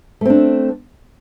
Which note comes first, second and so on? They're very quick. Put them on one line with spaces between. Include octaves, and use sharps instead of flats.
A3 C4 D4